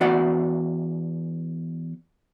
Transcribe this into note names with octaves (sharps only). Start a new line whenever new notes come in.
E2 F#4 D5 F#5